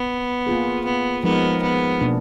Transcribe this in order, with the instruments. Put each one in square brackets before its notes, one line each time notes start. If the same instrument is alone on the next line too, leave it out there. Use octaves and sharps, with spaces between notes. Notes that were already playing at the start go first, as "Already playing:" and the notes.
Already playing: [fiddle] B3
[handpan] A#3 F4 G#4
[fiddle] B3
[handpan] F3 G#3 D#4 A#4 [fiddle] B3
[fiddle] B3
[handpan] B2 A#3 D4